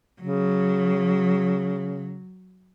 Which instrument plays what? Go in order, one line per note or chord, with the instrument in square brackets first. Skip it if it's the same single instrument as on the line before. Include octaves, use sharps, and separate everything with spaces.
[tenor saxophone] C#3 [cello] F#3